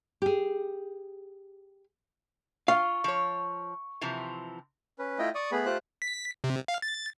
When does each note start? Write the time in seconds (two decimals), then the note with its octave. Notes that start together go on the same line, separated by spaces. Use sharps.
0.22 G4 G#4
2.68 F4 F5 C#6
3.04 F3 C#5 C#6
4.01 C3 E3 F3
4.99 C#4 B4
5.19 A3 E4 F4 D#5 G5
5.35 D5 C#6 D#6
5.52 A3 B3 G#4 B5
5.66 A3 F4 G4 C5 F#6
6.02 B6
6.44 C3
6.68 F5
6.82 A6